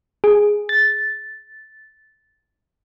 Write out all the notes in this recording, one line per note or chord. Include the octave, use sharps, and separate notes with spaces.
G#4
A6